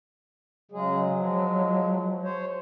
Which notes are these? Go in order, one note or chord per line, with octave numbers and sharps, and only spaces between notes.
C#3 F#3 G#3 G#4
F3 G#3
C5 C#5